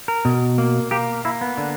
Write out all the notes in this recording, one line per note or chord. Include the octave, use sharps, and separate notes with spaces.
A#4
B2
A#3
A#3 G4
A#3 E4
B3
D3